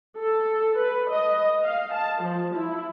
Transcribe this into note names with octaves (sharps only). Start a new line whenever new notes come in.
A4
B4
D#5
F5
A5
F3
E4